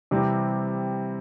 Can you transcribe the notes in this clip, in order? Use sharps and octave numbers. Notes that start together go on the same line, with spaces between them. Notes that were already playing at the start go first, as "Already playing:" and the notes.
C3 E3 G3 C4